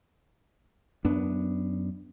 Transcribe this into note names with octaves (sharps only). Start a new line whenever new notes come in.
F#2 B3 D4